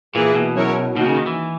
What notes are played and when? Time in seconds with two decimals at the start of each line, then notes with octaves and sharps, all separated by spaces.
0.15 A#2 E3 A#3 E4 G#4 B4
0.35 B2
0.56 F#3 C#4 E4 A#4 C#5
0.96 B2 D#3 A#3 D#4 F#4
1.06 C#3
1.16 D#3
1.26 E3